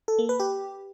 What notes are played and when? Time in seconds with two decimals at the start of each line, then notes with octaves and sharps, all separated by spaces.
0.08 A4
0.19 A#3
0.29 B4
0.40 G4